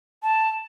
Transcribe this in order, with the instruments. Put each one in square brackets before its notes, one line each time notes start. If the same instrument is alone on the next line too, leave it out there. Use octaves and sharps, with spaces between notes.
[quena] A5